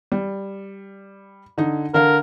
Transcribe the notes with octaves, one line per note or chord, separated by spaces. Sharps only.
G3
D3 D#4
D3 A#4 F5